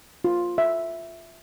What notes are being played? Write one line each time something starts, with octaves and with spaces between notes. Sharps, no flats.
F4
E5